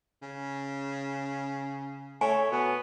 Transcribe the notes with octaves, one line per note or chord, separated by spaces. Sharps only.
C#3
A3 C#5 G#5
B2 B3